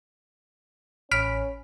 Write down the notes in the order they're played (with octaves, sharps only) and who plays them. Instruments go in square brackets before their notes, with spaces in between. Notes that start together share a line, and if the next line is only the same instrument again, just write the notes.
[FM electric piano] A1 B5 [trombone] C#4 [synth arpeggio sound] F6 B6 D7